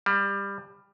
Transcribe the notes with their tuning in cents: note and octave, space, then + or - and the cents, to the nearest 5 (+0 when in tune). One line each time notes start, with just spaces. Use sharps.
G3 +20